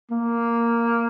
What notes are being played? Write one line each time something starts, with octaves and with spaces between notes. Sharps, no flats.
A#3